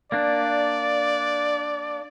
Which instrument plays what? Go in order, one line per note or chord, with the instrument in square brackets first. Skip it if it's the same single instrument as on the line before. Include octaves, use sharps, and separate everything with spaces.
[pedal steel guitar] A#3 D4 [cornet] D5